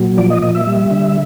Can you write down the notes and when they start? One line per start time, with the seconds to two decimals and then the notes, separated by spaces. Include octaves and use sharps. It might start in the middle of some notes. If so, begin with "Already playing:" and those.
Already playing: A#2 F#3
0.18 F3 D5
0.30 D#5
0.42 A#2 D#5
0.55 E5
0.67 G3
0.91 D3